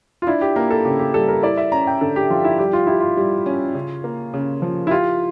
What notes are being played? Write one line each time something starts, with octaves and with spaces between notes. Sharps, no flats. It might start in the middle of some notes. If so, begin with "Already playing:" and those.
F4
D4 E4
G4
A#3 A#4
A4
C#3 G4
G4
G3 A4
A#4
E4 D5
E5
C#4 A#5
G5
D3 A4
G4
F3 F4
E4
G3 G4
F4
E4 G4
F4
G3
C#4
C#3
A#3
C#3
F3
E4
F4 G4